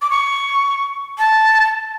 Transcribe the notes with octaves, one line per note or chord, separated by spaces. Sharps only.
D6
C#6
A5